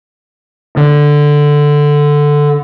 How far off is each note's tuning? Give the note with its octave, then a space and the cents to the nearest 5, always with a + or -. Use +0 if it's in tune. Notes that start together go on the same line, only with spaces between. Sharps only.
D3 +0